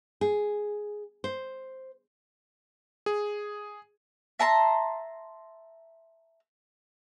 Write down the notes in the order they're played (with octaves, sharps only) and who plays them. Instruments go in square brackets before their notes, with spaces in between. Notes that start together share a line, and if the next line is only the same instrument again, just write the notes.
[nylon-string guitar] G#4
C5
[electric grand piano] G#4
[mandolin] E5 A5 A#5 C6